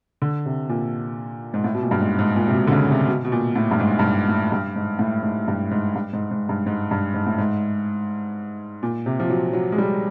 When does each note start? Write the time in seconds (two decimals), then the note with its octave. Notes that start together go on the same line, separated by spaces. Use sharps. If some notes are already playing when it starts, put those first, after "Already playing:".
0.22 D3
0.46 C3
0.69 A#2
1.54 G#2
1.64 A2
1.74 B2
1.82 A#2
1.91 G2
2.00 G#2
2.19 G#2
2.36 A#2
2.48 C3
2.54 B2
2.67 D3
2.72 C#3
2.91 C3
3.07 B2
3.25 B2
3.32 A#2
3.56 A2
3.71 G2
3.80 G#2
3.99 G2
4.03 G#2
4.28 A2
4.52 G2
4.76 G#2
4.99 A2
5.23 G#2
5.48 G2
5.71 G#2
5.95 G2
6.13 G#2
6.31 G#2
6.49 G2
6.66 G#2
6.91 G2
7.14 G#2
7.26 A2
7.38 G#2
8.83 A#2
9.06 C3
9.20 F3
9.30 F#3
9.53 F#3
9.72 G#3
9.78 G3